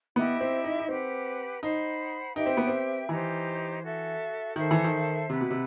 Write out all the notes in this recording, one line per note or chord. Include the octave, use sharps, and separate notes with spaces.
B3 E4 G4 D#5
C4
D#4
D#4
C4 G4 B4 F#5
D#4 C5 F#5 B5
D#4 G4 B4 E5 G5
C4
B3
C4
E3 D#4 G4 C5
F#4 A4 E5
D#3 A4 C5 E5
E3
D#3
C3 B4 F#5 B5
B2
C3